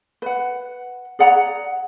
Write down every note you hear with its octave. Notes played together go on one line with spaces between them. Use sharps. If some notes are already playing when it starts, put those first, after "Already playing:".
B4 F#5
G#4 D5 F#5 A#5